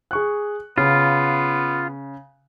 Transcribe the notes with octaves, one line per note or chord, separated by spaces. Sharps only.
G#4 C#6 F#6
C#3 B3 F4